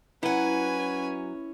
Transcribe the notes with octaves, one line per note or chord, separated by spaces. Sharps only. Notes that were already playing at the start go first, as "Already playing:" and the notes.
F#3 C#4 E4 B4 F#5 G#5